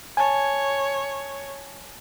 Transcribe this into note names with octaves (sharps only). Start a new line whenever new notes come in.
C#5 G#5 A5